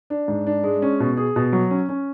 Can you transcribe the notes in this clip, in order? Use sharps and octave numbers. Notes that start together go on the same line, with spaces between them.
D4
G#2
D4
G#3
C#4
B2
G#4
B2
F#3
C#4
C#4